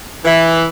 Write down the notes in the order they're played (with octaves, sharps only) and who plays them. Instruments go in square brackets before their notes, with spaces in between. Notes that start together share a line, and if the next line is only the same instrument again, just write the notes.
[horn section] E3